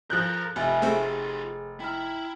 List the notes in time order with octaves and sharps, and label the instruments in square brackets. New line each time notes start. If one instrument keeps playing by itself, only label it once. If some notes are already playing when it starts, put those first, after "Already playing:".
[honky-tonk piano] F3 F#6 G6 [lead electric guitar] A4 A#4
[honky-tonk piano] F1 [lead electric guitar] F4 G4 [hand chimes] E5 G#5 B5
[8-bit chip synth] A3 C4 [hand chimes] G#4
[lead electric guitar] E4 [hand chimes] G5 A#5 F6